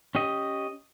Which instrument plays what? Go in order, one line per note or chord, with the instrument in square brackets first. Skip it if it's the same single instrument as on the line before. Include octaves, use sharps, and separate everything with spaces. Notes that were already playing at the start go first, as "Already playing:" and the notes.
[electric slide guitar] C#4 G4 D#5